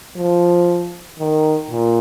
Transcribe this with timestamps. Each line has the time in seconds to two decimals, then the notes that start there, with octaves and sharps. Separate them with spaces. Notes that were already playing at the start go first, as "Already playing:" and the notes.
0.16 F3
1.19 D#3
1.70 A#2